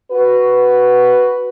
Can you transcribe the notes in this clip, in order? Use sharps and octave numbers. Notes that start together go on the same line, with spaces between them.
F#4 B4